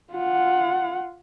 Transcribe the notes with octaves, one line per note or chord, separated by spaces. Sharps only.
F4 F#5